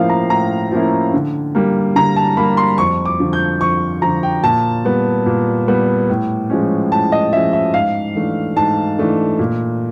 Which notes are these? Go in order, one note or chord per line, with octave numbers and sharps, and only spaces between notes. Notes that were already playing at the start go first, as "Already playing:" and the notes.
Already playing: A2 F3 A#3 C#4 E4 F5
A#5
A2 A#5
F3 A#3 C#4 E4
D3
G3 A#3
D3 A#5
A5
G3 A#3 B5
C6
F2 C#6
D6
D3 F3
G6
F2 C#6
D3 F3 A#5
G5
A#2 A5
G3 B3
A#2
G3 B3
A2
F3 G#3 C#4
A2 A5
D#5
F3 G#3 C#4 E5
E5
G#2 F5
E3 A3 D4
G#2 A5
E3 A3 D4
A#2